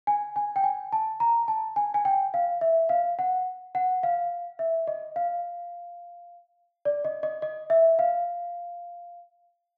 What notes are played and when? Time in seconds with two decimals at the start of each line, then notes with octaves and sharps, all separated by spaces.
0.07 G#5
0.36 G#5
0.56 G5
0.64 G#5
0.93 A5
1.20 A#5
1.48 A5
1.76 G#5
1.94 G#5
2.05 G5
2.34 F5
2.61 E5
2.89 F5
3.19 F#5
3.75 F#5
4.03 F5
4.59 E5
4.87 D#5
5.16 F5
6.85 D5
7.05 D#5
7.23 D#5
7.42 D#5
7.70 E5
7.99 F5